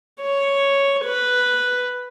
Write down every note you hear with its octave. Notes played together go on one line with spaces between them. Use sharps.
C#5
B4